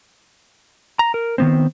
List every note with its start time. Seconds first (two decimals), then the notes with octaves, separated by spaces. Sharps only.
0.99 A#5
1.14 A#4
1.38 D#3 B3 C4